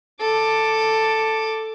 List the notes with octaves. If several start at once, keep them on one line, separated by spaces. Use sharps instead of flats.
A4 D6